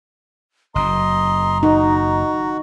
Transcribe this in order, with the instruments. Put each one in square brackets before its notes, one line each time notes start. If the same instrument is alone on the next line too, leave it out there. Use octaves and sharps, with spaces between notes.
[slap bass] F#1 F#2 [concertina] D#5 C6 [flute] A#5
[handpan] D#4 [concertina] F#4